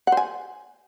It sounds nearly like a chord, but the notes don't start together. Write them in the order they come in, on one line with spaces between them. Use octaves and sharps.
F#5 C5 G#5